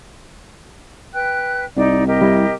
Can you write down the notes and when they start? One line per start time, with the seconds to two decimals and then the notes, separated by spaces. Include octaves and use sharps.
1.14 B4 G5 F#6
1.77 C2 D#4 D5
2.06 G4 A#4 D#5
2.21 G3 E4